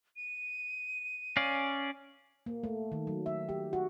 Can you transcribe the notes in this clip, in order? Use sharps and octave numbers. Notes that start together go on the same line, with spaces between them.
D#7
C#4 D5 F5
A#3
A3
D#3
F#3
E5
G4
F#4